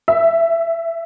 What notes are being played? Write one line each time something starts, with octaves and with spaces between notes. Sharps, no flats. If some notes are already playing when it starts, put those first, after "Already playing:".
E5